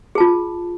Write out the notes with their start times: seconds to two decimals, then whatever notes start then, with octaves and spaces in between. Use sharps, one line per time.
0.15 G#4
0.18 A5
0.20 F4